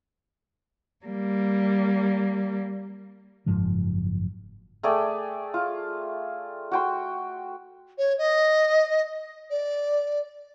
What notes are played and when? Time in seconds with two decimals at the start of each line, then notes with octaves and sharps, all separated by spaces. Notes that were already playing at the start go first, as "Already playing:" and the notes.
1.06 G3 A#3
3.46 F#1 G#2 F3 G#3
4.83 A3 G#4 D5 G5
5.54 F4
6.72 F#4 G5 C6
7.98 C#5
8.18 D#5
9.50 D5